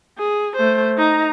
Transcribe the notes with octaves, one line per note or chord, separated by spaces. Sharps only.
G#4
A3 C5
D#4 A#5